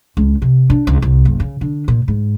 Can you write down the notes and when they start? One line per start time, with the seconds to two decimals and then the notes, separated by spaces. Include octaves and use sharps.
0.17 C#2
0.42 C3
0.70 D4
0.87 C#2
1.02 C2
1.25 F#1
1.40 C#3
1.61 D3
1.88 A#2
2.08 G#2